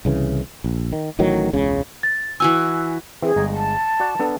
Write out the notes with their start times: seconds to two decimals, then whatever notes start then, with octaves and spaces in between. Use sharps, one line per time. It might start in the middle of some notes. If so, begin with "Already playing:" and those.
0.05 C2 C#3 E3
0.64 A#1
0.92 D#3
1.19 A1 A2 D#3 F#3
1.53 E1 C#2 C#3
2.03 A6
2.40 E3 F#4 G#5 E6
3.22 E3 C4 G#4
3.36 G1 G#3 A#5
3.55 A5
4.00 F#4 D5 F#5
4.19 B3 D4 A4